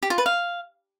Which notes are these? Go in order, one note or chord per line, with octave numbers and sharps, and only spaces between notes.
G4
F4
B4
F5